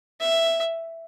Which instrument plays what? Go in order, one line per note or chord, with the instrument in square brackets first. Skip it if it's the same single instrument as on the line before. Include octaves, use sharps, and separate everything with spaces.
[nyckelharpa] E5